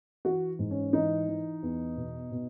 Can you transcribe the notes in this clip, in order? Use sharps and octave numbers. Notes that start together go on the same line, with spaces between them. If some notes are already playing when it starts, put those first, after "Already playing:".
E3 F#4
G#2
C#4
E3 D#4
E3
E2
B2
B2